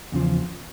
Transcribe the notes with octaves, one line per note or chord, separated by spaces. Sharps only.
E2 C#3 F3